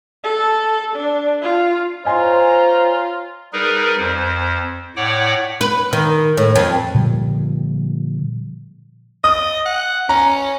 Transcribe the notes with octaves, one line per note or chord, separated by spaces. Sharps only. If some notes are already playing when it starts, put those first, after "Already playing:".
A4
D4
F4
F4 C5 C#5 D#5 G#5 A#5 C6
G3 D#4 G#4 A#4 B4
F2 C5
A2 C#5 D5 F#5 G5 D6
B4
D#3
A2
F2
A#2 D3 F3 G3
D#5 D#6
F#5
C#4 A#5